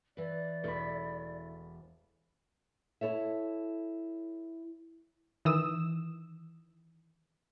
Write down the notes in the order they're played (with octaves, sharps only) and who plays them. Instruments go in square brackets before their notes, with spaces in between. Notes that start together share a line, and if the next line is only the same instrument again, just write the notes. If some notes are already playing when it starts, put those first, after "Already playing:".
[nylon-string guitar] E3 B4 [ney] D5
[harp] E1 B5 [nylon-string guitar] A3 E4
[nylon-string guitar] E4 A4 C#5 E5
[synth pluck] D#3 E3 D#6 E6 E7